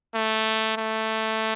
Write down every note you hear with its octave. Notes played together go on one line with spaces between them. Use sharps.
A3
A3